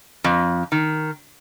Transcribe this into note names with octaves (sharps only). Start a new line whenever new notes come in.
F2
D#3